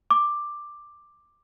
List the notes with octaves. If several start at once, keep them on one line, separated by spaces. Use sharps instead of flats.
D6